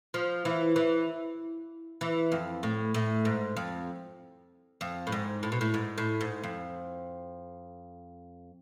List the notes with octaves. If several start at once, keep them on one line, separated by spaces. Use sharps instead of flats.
F3
E3
E3
E3
F2
A2
A2
G#2
F2
F2
A2
G#2
A2
B2
A2
G#2
A2
G#2
F2